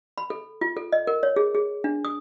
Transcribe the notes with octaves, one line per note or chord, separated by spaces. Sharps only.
B5
A4
F4
A4
D#5
A#4
C#5
G#4
G#4
D4
D#6